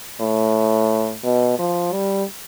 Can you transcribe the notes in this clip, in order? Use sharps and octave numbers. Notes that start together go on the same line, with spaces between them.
A2
B2
F3
G3